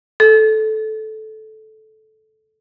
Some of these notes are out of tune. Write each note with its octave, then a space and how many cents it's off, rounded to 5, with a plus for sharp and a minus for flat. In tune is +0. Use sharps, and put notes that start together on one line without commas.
A4 -15